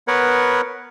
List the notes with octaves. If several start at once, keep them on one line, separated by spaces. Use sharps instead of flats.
B3 A#4 B4 C#5 F#5